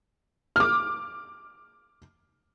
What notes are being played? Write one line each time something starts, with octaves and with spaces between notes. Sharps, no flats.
D6 F6